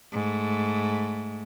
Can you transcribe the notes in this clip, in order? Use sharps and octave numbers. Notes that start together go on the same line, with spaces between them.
G#2 A3